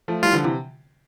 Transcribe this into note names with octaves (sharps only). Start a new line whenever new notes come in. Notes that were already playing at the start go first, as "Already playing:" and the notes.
F3 A3
E3 G3 F4
D3 F3
C3 E3